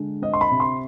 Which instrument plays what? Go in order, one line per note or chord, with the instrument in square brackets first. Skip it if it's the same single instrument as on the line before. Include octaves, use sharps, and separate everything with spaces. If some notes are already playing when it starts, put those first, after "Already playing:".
Already playing: [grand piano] D3 G#3
C4 D#5
C6
B5
C3
C6